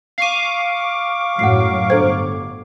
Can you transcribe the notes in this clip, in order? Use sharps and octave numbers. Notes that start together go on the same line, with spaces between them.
F5 C#6 D6 C7 D#7
F#2 A2 F#3 F#5 C7
G1 D4 A4 C5